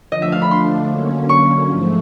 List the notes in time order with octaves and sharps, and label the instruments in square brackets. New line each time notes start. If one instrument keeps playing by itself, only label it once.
[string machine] D3 F3 A3 D4 [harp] D#5
[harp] E5
F5
B5
C6
[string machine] D3 F#3 A#3 C#4
[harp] C#6
[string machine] G#2 F3 A3